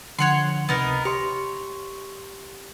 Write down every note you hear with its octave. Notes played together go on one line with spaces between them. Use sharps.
D3 F3 C#5 F#5 C6
C#2 C3 B3 D#4 A#4
G4 C#5 C6